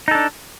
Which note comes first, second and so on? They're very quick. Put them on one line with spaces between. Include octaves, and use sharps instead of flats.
D#4 A4 D4